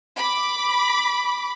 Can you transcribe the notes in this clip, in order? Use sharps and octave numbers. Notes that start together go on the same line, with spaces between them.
B5 D6